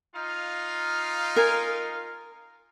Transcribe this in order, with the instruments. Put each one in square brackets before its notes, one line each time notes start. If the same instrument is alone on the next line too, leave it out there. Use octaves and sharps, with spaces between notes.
[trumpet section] D#4 F4 F5
[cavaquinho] A#4 G#5